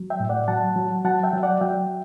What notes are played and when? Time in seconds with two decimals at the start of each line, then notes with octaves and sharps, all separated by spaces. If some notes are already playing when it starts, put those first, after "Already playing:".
Already playing: F#3
0.10 E5 G5
0.20 A2
0.29 D5 F#5
0.48 F#3 F#5 A5
0.76 F#3
1.05 F#3 F#5 A5
1.24 E5 G5
1.33 F#3
1.43 D5 F#5
1.61 F#3 E5 G5